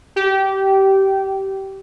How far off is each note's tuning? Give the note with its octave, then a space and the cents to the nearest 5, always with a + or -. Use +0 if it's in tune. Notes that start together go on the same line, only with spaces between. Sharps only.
G4 -20